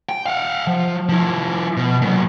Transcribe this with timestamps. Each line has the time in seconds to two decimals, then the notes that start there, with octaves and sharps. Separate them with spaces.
0.09 G5
0.26 F5 F#5
0.67 F3
1.09 F3 E4
1.77 B2
2.02 A#2 F#3